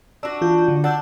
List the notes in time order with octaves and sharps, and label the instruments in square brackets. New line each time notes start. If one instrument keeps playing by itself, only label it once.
[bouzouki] D4 F#4 [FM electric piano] E6
[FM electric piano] E3 F4 G6
D3
[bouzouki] D4 [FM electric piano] F#5 E6 G6